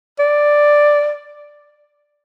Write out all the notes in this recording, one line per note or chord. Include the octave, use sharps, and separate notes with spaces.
D5